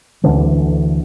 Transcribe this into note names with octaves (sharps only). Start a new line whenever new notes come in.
D2 D3 E3